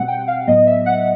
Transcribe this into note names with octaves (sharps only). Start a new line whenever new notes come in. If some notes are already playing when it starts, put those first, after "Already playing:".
Already playing: B2 G3 C4 F#5
G5
F5
A2 F#3 B3 D#5
E5
F#5